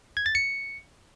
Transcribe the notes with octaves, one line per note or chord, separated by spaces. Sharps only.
G#6
A6
C#7